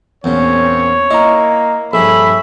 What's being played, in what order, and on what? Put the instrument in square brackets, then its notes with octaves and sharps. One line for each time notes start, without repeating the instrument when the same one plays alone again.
[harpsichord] E2 A#2 [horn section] A#3 C4 C#4 [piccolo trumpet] C#5
[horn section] A#3 [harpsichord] E4 [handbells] D#5 A#5
[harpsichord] A#1 G2 [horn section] G#4 C#5 E5 [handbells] A4 [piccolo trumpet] B5